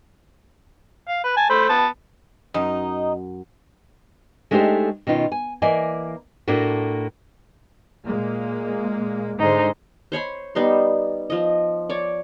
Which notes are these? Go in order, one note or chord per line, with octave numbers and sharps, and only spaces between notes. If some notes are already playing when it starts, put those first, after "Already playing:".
F5
B4
G#5 A5
A3 C5 B5
B3 A5
F#2 D#4
G#3 A3 D4 D#4 G4 C5
B2 D#3 C#4 D#4 F4
G#5
E3 A#3 D5 D#5 G#5
A2 A3 A#3 D4 F#4
A#2 G#3 A#3
G#2 D3 G#3 D#4 C5
C5 C#5 B5 C6
G3 B3 D#4 C6
F3 D#5
C#5 D5